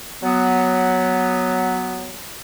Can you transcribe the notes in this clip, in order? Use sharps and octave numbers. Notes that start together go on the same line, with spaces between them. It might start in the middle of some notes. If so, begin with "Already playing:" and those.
F#3 B3